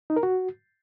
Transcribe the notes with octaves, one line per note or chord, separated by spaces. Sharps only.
D#4
A#4
F#4